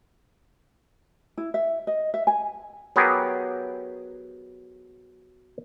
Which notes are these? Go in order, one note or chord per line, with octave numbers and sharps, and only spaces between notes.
E4
E5
D#5
E5
G#5
F#3 B3 G4 G#4 A#4